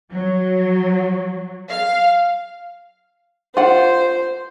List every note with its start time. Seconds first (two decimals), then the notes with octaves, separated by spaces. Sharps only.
0.11 F#3
1.69 F5
3.57 F4 C5 F#5